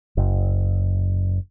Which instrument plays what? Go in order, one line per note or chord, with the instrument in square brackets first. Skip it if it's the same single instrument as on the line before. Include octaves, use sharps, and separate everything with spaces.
[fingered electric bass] F#1